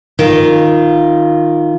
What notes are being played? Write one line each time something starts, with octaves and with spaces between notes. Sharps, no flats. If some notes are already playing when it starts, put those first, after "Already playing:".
D#3 F4